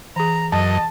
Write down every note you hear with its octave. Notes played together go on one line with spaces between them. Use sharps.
E3 G#4 A#5
F#2 D#5 A5